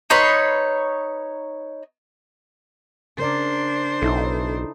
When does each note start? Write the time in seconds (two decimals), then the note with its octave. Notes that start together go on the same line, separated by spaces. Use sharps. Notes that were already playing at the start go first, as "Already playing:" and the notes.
0.10 D#4 B4 C#5 C6
3.18 C#3 D4 A#4 C5 D5
4.02 B1 D#4 E4 A4